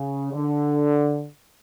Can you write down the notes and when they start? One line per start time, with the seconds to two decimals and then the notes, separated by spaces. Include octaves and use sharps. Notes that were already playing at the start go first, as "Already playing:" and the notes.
Already playing: C#3
0.33 D3